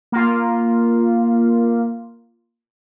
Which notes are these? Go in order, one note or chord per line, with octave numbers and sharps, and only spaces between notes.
A#3 F4